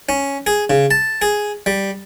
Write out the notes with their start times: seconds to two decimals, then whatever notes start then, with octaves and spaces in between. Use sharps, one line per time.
0.09 C#4
0.47 G#4
0.70 C#3
0.91 A5
1.22 G#4
1.66 G3